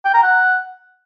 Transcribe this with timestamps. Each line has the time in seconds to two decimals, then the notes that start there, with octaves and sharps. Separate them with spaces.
0.05 G5
0.14 A#5
0.23 F#5